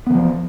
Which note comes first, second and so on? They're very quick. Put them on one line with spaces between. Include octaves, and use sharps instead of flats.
B3 E3 F3